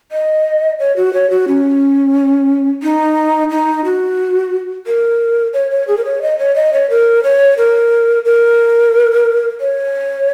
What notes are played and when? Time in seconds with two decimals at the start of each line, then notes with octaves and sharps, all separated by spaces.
0.12 D#5
0.79 C#5
0.97 F#4
1.14 C#5
1.30 F#4
1.48 C#4
2.83 D#4
3.51 D#4
3.85 F#4
4.87 A#4
5.53 C#5
5.71 C#5
5.88 G#4
5.97 A#4
6.05 C#5
6.22 D#5
6.39 C#5
6.56 D#5
6.73 C#5
6.90 A#4
7.24 C#5
7.58 A#4
8.25 A#4
9.60 C#5